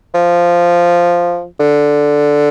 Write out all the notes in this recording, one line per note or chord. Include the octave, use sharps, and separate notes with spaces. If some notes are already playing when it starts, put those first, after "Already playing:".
F3
D3